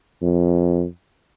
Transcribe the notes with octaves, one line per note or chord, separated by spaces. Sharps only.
F2